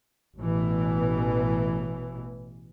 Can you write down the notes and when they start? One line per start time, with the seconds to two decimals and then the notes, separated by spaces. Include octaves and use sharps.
0.38 A1 B2 E3